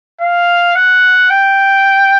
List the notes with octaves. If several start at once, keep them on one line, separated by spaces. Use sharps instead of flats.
F5
F#5
G5